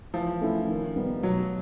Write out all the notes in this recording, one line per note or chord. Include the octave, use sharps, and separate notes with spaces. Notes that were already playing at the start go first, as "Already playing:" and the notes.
E3 F3
A3 C#4 E4
D#3
G3 B3 D#4
B2 F#3